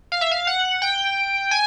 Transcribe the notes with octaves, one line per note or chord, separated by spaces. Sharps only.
F5
E5
F5
F#5
G5
G#5